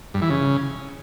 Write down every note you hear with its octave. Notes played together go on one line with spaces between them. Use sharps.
G2
E3
C#3